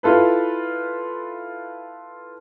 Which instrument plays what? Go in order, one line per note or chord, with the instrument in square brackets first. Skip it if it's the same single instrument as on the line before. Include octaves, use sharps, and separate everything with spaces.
[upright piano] E4 F4 A4 B4